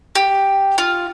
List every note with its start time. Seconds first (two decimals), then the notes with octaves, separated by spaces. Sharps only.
0.15 G4
0.78 F4